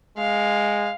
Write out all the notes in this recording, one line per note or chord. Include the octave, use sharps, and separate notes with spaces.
G#3 F5